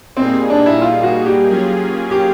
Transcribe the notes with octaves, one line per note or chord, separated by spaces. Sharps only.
A#2 G3 A#3 C4 D#4 G#4
D4
E4
F4
F#4
G4
F#3 A#3 C#4 F4 G#4
G4